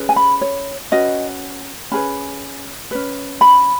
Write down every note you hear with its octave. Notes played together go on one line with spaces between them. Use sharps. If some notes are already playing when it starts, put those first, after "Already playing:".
Already playing: C#4 G#4 B4
G#5
B5
C#5
C#4 F#4 B4 D#5
C#4 G#4 B4 B5
C#4 B4
B5